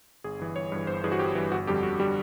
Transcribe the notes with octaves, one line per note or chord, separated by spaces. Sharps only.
G1 G#4
G2 E3
G1 C#5
G2 E3
G1 C5
G2 E3 G#4
F#4
G1 G4
G2 E3
G1 F#4
F2 D3 G3 G4
G1 F#4
D3 G3 G4